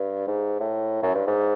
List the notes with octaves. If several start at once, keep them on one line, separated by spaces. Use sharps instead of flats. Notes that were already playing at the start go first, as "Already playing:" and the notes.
Already playing: G2
G#2
A2
F#2
G2
G#2